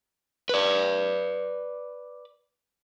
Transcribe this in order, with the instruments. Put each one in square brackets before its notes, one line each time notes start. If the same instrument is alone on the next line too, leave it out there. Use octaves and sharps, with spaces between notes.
[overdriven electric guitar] B4 D5